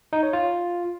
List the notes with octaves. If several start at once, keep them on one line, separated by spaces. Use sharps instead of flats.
D#4
C#5
F4